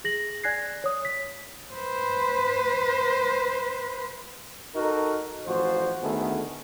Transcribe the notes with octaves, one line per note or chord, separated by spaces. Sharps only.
G#4 A#6 F#7
D5 G#5 F#6 G#6 A#6 C7
C#5 D#6
B6
B4 C5
D#4 F#4 A4 A#4
A1 F3 F#4 C5
D2 D#3 A3 B3 G#4 A4